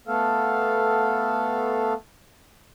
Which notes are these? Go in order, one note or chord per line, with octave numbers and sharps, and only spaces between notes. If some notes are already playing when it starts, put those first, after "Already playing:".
A3 B3 A4 F5